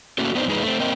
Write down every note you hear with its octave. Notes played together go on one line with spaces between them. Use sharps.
A3 A#3 C#4 F#4 A4
B3 C4 D4 D#4 C5
E2 G#3 D#4 G#4 B4
A3 C4
A#3 C4 A#4 D#5 G5